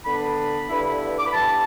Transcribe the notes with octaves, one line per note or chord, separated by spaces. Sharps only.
D3 B3 D4 B5
G2 D3 B3 E4
D6
B5
G2 E3 B3 A5